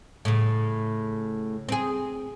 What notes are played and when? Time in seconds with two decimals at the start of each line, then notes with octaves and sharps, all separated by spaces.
0.25 A2 C#3
1.69 C4 G#4